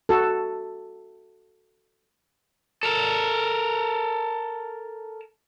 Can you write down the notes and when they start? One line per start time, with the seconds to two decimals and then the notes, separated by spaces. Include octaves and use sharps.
0.09 F#4 A4
2.83 A4 A#4